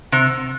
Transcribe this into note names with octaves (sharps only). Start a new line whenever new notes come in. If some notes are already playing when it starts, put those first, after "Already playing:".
C3